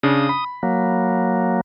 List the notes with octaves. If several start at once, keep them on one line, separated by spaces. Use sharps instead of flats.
C#3 D4 D#6
B5
F#3 A#3